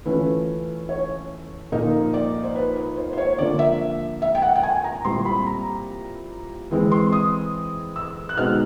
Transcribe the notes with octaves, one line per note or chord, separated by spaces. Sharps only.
E3 A3 C#4 F4 B4
C#5
A#2 F3 A#3 D#4
D5
C5
B4
B4
C5
C5
C#5
D3 F3 A#3 D5
E5
E5
G5
F#5
G5
G#5
A#5
A#2 G3 C4 E4 C6
B5
A#5
E3 G#3 C4
C6
D#6
E6
F#6
B2 G#3 C4 D#4 F6